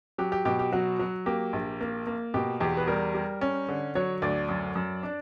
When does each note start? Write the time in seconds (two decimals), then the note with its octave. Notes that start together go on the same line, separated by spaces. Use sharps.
0.18 F#3 G4
0.32 G4
0.45 B2 G4
0.59 G4
0.72 F#3 F#4
0.99 F#3
1.26 A#3 G4
1.53 A#1
1.80 A#3
2.07 A#3
2.34 B2 G4
2.60 E2 G4
2.77 B4
2.87 G3 A#4
3.15 G3
3.41 C#4
3.69 D3
3.95 F#3 C#5
4.22 D2 D5
4.49 F#2
4.75 F#2
5.03 D4